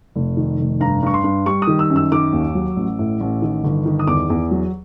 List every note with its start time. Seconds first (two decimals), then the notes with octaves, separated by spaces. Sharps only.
0.16 F1
0.37 D#3
0.59 F1
0.80 G2 A#5
1.03 G2 C#6
1.14 C6
1.24 G2
1.46 G3 C#6
1.62 D#6
1.67 D#3
1.79 E6
1.90 F#2
1.96 E6
2.12 D#3 D6
2.33 D#2
2.55 F#3
2.76 A1
2.99 A2
3.20 A1
3.42 D#3
3.64 G1
3.86 D#3
3.99 D#6
4.07 E2 D6
4.30 E2
4.51 F#3